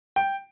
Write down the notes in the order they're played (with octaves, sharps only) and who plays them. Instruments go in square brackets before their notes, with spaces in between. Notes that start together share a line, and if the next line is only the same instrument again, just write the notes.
[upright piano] G5